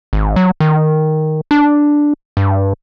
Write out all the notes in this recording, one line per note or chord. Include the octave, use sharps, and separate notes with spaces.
G#1
F#3
D#3
D4
G2